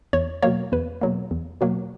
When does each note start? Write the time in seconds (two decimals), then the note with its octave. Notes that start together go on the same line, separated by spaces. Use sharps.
0.13 E2 C#5
0.42 B2 F#3 A#3 C#5
0.72 E2 B4
1.01 B2 F#3 A#3
1.31 E2
1.61 B2 F#3 A#3